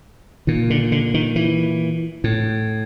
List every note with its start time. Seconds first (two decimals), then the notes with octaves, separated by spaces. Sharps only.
0.47 A#2 D#3
0.70 D3
0.92 D3
1.14 D#3
1.36 E3
2.24 A2